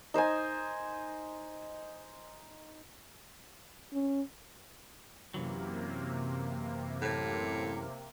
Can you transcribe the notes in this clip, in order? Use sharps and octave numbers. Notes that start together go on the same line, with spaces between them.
D#4 C5 D#5 G#5
C#4
F#2 C3 E3 F#3 A#3
A2